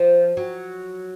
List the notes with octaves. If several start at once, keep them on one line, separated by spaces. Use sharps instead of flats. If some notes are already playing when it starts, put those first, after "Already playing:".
Already playing: F3
F#3